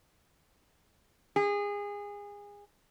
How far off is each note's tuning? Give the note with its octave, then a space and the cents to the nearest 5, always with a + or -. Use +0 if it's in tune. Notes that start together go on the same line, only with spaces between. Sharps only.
G#4 -25